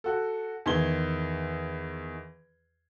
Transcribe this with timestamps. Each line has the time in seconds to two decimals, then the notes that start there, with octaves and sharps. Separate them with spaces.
0.04 F#4 A4
0.66 E2 D#3 C6 G#6 G7